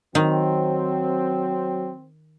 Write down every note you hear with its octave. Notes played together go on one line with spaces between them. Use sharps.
D#3 F#3 C4